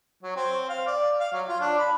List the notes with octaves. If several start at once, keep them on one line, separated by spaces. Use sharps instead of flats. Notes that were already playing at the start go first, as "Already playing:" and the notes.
F#3
C4
F5
D5
F5
F#3
F4
D4
B5